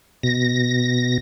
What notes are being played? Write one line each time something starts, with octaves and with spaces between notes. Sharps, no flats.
B2 A#6